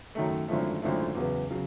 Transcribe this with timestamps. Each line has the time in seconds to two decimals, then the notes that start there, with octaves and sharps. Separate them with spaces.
0.15 F#2 D#3 F#3 A3
0.48 G#1 F#2 D3 F3 A3
0.82 G#1 F#2 D3 F3 A3
1.15 E2 C#3 F#3 B3
1.51 C#3 F#3